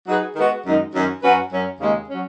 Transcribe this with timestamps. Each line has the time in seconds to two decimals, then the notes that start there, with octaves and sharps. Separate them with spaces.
0.07 F#3 D#4 G#4 B4
0.36 D#3 G#3 B3 F#4
0.65 F#2 D#3 G#3 D#4
0.93 F#2 D#3 F#3 C#4 F#4
1.22 F#2 F#3 C#4 F#4 B4
1.51 F#2 F#3 C#4
1.81 D#2 C#3 G#3
2.09 F#3 C#4